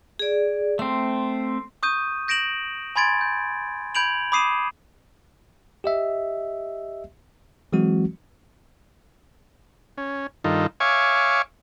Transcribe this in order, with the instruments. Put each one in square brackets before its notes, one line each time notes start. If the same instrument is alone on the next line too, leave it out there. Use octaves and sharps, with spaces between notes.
[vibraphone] G#4 D5
[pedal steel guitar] A3 C4 [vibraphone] C6
[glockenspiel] C#6 D#6 G6 D#7
G6 A#6 D7 E7 F#7
G#5 B5 C6 G#6 A6 D7
G6
B5 G6 G#6 D7 F7 F#7
B5 D6 D#6 C7 D#7 E7
[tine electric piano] G4 D#5 E5
E3 F#3 G#3 C4 F#4
[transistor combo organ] C#4
G2 D#3 D#4 F4 A4
C#5 E5 F5 G#5 C#6 D6